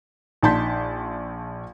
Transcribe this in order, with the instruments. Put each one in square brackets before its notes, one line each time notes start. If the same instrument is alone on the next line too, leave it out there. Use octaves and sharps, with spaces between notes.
[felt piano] A#1 D#4 A5 C6 G6 B6